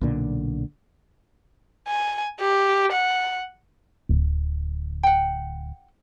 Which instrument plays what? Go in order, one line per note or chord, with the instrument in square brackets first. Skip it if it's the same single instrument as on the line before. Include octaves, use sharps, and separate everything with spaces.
[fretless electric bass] B1 A#2 D3
[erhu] G#5
G4
F#5
[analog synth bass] D1
[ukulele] F#5 G5